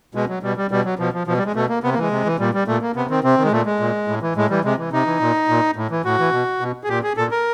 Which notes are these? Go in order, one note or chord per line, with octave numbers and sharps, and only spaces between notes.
B2 G#3
F#3
B2 G3
G3
B2 G3
F#3
B2 F3
F3
B2 F3
G3
G#3
B2 A3
A#3
C3 B3
A#3
E3 G#3
C3
E3
A#2 G3
G3
A#2 A3
A#3
C3 B3
D#3 C4
C3 C4
D#3
G#3
A#2 A3
G#3
A#2
A2
E3
A2 G#3
E3 G3
C3 G#3
E3
C3 D#4
E3
A#2
A#2
A2
E3
A2 F#4
E3
B2
B2
G#4
A#2 G4
G#4
A#2 A4
A#4